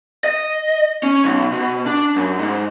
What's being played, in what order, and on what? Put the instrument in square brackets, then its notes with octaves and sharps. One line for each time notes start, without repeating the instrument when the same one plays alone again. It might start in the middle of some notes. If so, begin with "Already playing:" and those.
[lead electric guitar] D#5
C#4
B1
B2
D4
F#2
G#2